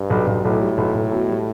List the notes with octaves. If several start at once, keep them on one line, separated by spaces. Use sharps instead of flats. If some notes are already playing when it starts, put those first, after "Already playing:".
Already playing: G2
B1
B1
B1 A2
G3
B1
B1
B2
G3